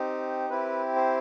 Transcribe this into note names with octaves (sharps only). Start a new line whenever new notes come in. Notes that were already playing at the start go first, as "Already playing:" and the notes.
Already playing: C4 D#4 G4
C4 E4 G4 B4
C5